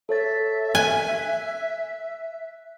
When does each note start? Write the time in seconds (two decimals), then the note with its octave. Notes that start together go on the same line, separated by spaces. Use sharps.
0.09 A4 C#5 E5 A6
0.75 G#5 F#6